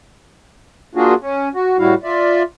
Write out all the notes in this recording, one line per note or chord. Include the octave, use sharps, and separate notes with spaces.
A#3 D4 F4 F#4 G#4
C#4
F#4
A2 G3 E4 F#4 F5
F4 D5 E5